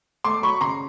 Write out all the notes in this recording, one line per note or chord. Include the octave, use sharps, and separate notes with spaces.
A3 C6 D6
F#3 B5 C#6
C#3 A#5 C6